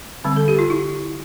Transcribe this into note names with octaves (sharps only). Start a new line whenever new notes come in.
D3 G3 C4
A4
G4
F4
E4